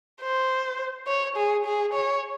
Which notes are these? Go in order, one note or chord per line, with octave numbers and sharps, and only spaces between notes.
C5
C#5
G#4
G#4
C#5